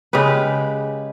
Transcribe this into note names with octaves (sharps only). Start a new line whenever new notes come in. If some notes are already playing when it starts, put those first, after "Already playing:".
C#3 G#3 G4 B4